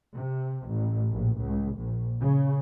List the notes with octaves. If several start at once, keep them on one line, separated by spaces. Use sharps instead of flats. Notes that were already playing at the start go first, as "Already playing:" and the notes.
C3
A1
A#1
C#2
A#1
C#3